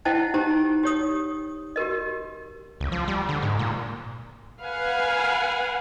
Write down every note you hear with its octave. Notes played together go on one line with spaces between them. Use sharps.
E4 C5 D#5 F#5 G5 A5
D#4 G4 C5 A#5
G4 C#5 D#6
F#4 G4 A#4 D#5
C#2
F3
G3
D3
G#2
A#2
B4 F5 F#5 G#5